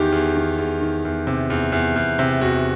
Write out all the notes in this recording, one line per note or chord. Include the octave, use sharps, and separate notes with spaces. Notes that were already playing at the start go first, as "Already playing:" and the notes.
Already playing: E2 D#3 G4
E2
D#3
E2
D#3
E2
C3
E2
E2
E2
C3
E2 F#4